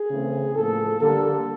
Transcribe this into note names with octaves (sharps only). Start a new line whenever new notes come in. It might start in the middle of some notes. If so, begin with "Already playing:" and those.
Already playing: G#4
C#3 E3 A3 C4
A2 F3 A#3 A4
D3 G3 A#3 A4